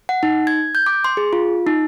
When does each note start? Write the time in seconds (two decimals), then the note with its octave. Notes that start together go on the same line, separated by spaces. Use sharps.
0.09 F#5
0.23 D#4
0.47 G#6
0.75 G6
0.86 D6
1.04 C6
1.17 G#4
1.33 F4
1.67 D#4